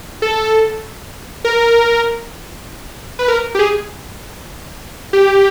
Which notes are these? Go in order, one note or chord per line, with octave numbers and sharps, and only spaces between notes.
A4
A#4
B4
A#4
G4
G#4
G4